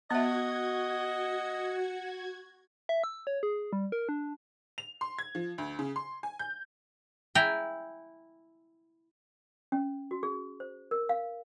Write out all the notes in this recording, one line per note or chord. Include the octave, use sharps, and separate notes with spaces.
B3 F#4 D#5 E5 F#5 G#6
E5
E6
C#5
G#4
G3
A#4
D4
F7
C6
G#6
F3
D2
C#3
C6
G#5
G6
E4 G5 G#5 A#5
C#4
F#4
G#4
C5
A#4
F5